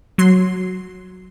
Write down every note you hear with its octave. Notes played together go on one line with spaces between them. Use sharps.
F#3 C6